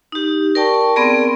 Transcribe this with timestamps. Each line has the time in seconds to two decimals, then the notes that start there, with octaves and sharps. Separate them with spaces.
0.12 D#4 G4
0.55 A#4 D5 G5 A5 C#6
0.96 B3 C4 G#4 A#4 D5